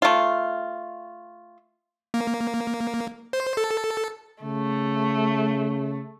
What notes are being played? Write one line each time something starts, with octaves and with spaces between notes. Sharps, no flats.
A3 F4
A#3
C5
A4
C#3 A3